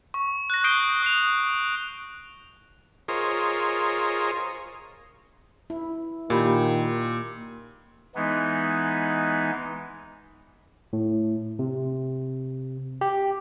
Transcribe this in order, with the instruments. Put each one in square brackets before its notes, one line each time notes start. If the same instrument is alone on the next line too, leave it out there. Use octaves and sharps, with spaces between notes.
[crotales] C#6
F#6 A#6
D#6 G6 C7 D7 D#7 G7
D#6 C7 F7
[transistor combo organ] F4 G#4 A#4 C5 C#5 D#5
[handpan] E4
[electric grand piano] A#2 [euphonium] D#3 [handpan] A#3 [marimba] G4 B5
[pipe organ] E3 G#3 B3 D#4
[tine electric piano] A2
C3
G4